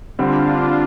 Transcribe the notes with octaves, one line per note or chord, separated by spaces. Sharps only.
D3 G3 C4 D4 F4